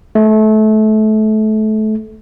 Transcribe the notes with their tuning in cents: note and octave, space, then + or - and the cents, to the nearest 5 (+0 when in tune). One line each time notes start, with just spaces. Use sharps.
A3 -25